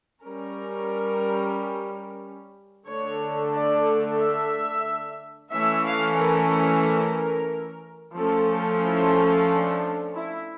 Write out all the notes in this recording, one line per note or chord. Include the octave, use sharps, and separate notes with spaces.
G3 C#4 A#4
D3 A3 D4 C#5
D5
E5
E3 A3 C#4 E5
F5
A#4
A#4
F3 A3 C#4 A4
E4
D4
E4